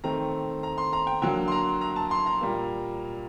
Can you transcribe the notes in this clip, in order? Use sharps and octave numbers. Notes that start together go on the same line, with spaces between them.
D#3 A3 C4 A#5
A#5
C6
A#5
G5
D3 F#3 A#3 G5
C6
A#5
A#5
A5
C6
A#5
A#2 G3 A#3